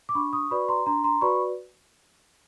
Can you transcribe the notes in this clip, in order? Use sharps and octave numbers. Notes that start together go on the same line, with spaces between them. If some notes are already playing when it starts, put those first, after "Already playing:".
D6
D4 B5 C#6
C#6 D#6
F#4 B4 D5 B5 C#6
A#5 C6
D4 A#5 C6
A#5 C6
F#4 B4 D5 B5 C#6